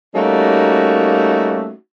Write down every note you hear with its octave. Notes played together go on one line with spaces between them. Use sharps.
G3 A3 A#3 C#4 D#4 F#4